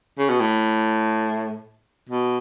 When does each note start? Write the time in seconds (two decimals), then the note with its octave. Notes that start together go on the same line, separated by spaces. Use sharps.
0.18 C#3
0.29 B2
0.40 A2
2.09 B2